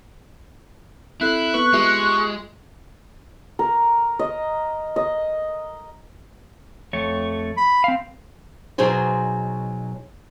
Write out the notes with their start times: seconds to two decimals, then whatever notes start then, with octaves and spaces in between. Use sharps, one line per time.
1.21 C4 E4 A4 F#6
1.54 B3 B4 C#6
1.73 G#3 F4 G4 E5
3.59 A#4
4.19 D#5
4.96 D#5
6.93 F2 A3 C#5
7.57 B5
7.84 C4 F5
8.78 B2 F#3 D#4 G#4 C5 G#5